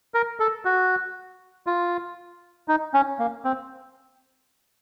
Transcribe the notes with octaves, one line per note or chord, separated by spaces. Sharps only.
A#4
A4
F#4
F4
D#4
C#4
A#3
C4